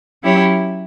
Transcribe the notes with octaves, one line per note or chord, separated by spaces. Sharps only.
F#3 C#4 E4 G4 C#5